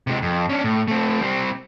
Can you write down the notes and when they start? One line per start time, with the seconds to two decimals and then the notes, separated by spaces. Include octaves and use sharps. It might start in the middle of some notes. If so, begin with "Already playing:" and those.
0.07 C3 G#3
0.22 F2
0.49 C#4 D4
0.64 A2
0.88 A3 C4
1.21 G3 C4